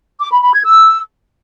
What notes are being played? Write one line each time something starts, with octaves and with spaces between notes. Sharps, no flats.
D6
B5
B5
G#6
E6